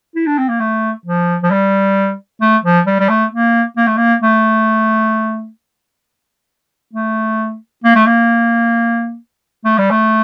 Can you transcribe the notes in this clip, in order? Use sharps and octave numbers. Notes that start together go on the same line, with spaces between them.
E4
D4
C4
A#3
A3
F3
F3
G3
A3
F3
G3
G3
A3
A#3
A#3
A3
A#3
A3
A3
A#3
A3
A#3
A3
G3
A3